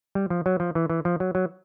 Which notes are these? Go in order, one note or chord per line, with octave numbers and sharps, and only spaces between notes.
G3
F3
F#3
F3
E3
E3
F3
F#3
F#3